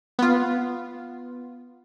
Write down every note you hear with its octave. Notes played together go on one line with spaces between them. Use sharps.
B3 F4